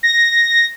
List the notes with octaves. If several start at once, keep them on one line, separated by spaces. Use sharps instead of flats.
A#6